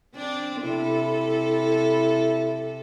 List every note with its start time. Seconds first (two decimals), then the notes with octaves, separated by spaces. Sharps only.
0.15 C4 D4 D5
0.62 C3 E4 A4